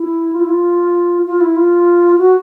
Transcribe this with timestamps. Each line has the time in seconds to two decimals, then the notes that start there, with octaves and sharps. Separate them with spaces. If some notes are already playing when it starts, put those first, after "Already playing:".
Already playing: E4
0.33 F4
0.41 E4
0.49 F4
1.26 F4
1.41 E4
1.56 F4
2.18 F#4